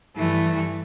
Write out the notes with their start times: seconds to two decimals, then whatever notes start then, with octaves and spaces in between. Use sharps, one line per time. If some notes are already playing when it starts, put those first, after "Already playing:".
0.17 G2 E3 A3